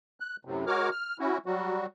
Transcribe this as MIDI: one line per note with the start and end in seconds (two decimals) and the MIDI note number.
0.20 0.36 90
0.45 0.65 42
0.45 0.65 45
0.45 0.65 48
0.67 0.89 56
0.67 0.89 66
0.67 0.89 70
0.67 0.89 73
0.67 0.89 86
0.67 0.89 89
0.91 1.17 89
1.19 1.38 61
1.19 1.38 64
1.19 1.38 66
1.46 1.86 54
1.46 1.86 55
1.46 1.86 66